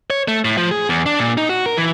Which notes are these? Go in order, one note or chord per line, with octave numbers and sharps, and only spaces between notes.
C#5
A3
A2
F3
G#4
E2
D4
A#2
D#4
F#4
A#4
E3